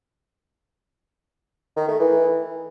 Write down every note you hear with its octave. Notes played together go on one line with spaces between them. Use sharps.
D#3
A3
E3